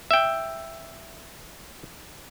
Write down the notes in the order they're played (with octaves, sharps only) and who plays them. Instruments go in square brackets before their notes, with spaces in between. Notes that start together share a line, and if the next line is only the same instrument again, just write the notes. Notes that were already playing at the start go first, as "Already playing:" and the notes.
[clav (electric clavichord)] E5 G5